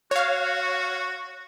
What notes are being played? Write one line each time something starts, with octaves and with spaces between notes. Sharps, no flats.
F#4 C#5 F5